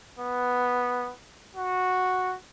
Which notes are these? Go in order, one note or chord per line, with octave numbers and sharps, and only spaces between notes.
B3
F#4